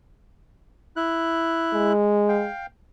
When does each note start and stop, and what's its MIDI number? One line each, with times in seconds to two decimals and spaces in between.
0.96 1.93 64
0.96 1.93 90
1.74 2.48 56
2.29 2.66 77
2.29 2.66 79